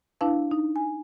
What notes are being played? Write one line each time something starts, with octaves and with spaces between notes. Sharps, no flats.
D4 E4 B4 F5 A5
D#4
G#5